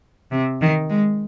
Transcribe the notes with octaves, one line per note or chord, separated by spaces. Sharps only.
C3
D#3
G#3